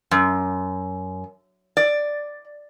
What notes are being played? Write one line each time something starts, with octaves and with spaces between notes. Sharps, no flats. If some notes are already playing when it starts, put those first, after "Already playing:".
F#2
D5